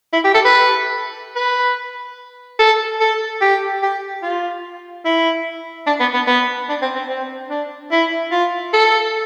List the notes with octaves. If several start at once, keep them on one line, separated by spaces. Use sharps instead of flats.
E4
G4
A4
B4
B4
A4
A4
G4
G4
F4
E4
D4
B3
B3
B3
D4
C4
C4
C4
D4
E4
F4
A4